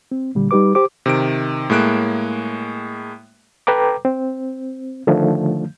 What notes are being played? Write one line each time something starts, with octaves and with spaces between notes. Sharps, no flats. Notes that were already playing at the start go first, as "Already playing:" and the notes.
C4
A#2 D3 G3
G3 D#4 G4 B4 D6
G4 C5 D6
C3 D#3 D7
A2 G#3 A#3 F#6 D7
A4 B4 G5 A#5 D6
C4
D3 D#3 F3 A3